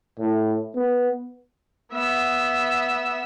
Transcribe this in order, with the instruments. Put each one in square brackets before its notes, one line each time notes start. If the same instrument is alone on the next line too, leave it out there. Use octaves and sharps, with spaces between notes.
[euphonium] A2
B3
[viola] B3 E5